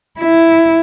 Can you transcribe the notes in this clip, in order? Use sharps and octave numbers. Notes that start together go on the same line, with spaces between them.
E4